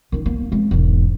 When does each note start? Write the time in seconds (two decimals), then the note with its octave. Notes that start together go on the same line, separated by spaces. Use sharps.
0.12 D#3 C#4
0.26 A#3 B3
0.52 G#3 C4
0.71 E1 G#2